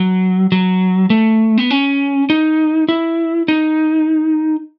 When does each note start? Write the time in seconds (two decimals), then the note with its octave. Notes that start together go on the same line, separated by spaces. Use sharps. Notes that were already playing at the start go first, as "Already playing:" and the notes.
Already playing: F#3
0.52 F#3
1.10 A3
1.58 B3
1.70 C#4
2.30 D#4
2.89 E4
3.48 D#4